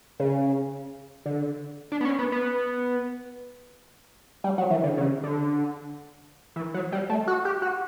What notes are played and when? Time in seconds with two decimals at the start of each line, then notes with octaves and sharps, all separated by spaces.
0.20 C#3
1.26 D3
1.92 D4
2.01 B3
2.05 C#4
2.19 B3
2.32 B3
4.44 G3
4.58 F#3
4.70 E3
4.83 D3
4.97 C#3
5.23 D3
6.56 E3
6.74 F#3
6.92 G3
7.10 A3
7.27 F#4
7.45 G4
7.62 F#4